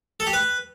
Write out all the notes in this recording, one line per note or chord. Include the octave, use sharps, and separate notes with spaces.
A4
G4
B4